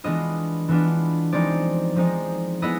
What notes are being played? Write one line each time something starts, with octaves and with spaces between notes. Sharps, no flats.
E3 G#3 B3 D4 F4 D#5
E3 G#3 B3 D4 F4
F3 G#3 C4 D#4 D5
F3 G#3 C4 D#4
G#3 B3 E4 D#5